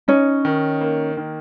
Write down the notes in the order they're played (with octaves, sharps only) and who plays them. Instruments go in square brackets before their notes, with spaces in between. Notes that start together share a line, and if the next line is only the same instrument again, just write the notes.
[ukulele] C#4 [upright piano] D#4
[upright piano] D#3
A#3
D#3